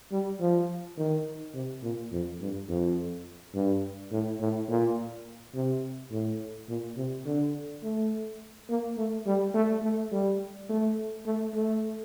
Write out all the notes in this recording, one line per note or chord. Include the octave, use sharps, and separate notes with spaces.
G3
F3
D#3
C3
A#2
F2
G2
F2
G2
A2
A2
A#2
C3
A2
A#2
C3
D3
A3
A#3
A3
G3
A3
A3
G3
A3
A3
A3